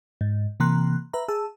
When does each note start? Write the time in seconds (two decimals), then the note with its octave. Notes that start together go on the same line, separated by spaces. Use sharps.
0.21 G#2
0.60 C3 E3 A#3 A#5 C6 F#6
1.13 B4 E5 A#5
1.28 G#4 A5 E6